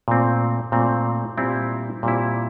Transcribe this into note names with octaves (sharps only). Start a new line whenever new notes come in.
A#2 A3 C4
A#2 A3 C4
A#2 G3 C4 E4
A#2 G3 C4 E4